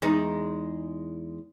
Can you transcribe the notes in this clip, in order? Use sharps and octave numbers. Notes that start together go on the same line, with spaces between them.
E2 G#3 D#4